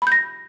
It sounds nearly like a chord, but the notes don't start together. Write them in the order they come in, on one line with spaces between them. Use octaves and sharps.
B5 G6 A#6